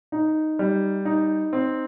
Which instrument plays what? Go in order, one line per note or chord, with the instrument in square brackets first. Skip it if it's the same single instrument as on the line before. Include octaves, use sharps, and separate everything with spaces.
[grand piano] D#4
G3
D#4
C4